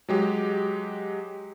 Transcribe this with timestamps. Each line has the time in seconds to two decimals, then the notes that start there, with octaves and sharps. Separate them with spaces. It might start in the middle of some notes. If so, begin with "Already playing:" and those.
0.09 F#3 G#3 G4